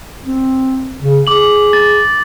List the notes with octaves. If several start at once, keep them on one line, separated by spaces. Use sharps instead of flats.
C4
C#3
G#4 D6 F#7
A6